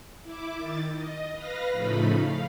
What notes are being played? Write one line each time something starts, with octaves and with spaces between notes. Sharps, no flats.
E4 D6
D#3 A6
D#5
B4 F5 A#6
A2 C#3 F3 A3 D#4 B5
F5